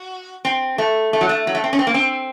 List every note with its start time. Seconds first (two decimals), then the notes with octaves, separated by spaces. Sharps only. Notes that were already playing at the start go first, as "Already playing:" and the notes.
Already playing: F#4
0.45 C4
0.78 A3
1.13 A3
1.21 F#3
1.29 A3
1.47 F#3
1.55 A3
1.64 C4
1.73 C#4
1.79 C4
1.87 A#3
1.94 C4